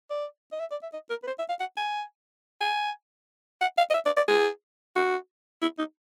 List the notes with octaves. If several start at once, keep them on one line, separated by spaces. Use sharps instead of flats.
D5
D#5
E5
D5
E5
D#5
A#4
B4
C5
E5
F5
F#5
G#5
G#5
F#5
F5
D#5
E5
D5
D5
G#4
F#4
E4
D#4